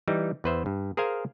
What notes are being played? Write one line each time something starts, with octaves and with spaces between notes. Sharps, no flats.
E3 G3 D#4
E2 B4 C5 E5
G2
G#4 A#4 C5 F5 G#5